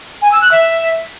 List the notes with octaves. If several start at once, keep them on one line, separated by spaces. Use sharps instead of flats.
G#5
E6
F#6
E5